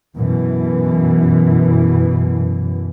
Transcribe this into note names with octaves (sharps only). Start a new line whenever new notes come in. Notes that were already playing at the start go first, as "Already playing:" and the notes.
F#2 B2 E3